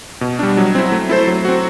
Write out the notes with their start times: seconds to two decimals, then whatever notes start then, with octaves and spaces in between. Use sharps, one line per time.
0.21 B2
0.39 G3 D4
0.57 F#3
0.75 C4 E4
0.92 A3
1.09 E4 A4 C5
1.27 F#3
1.45 C4 F#4